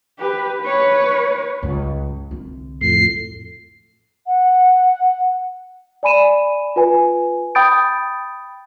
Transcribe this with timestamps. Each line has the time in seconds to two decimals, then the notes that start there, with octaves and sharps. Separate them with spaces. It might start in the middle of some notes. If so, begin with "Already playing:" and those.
0.19 G4 B4
0.61 B4 C#5
1.63 C#2 G2
2.31 C2 D3
2.81 F2 A2 C7
4.27 F#5
6.03 D5 G#5 B5 D#7 E7
6.76 F4 B4 G#5
7.55 G5 B5 D#6 G6 A6 D7